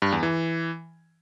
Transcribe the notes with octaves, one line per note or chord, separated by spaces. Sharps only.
G2
E2
E3